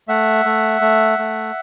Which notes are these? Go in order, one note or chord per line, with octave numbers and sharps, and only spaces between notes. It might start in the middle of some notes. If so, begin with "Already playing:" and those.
A3 E5 F#5
A3
A3
A3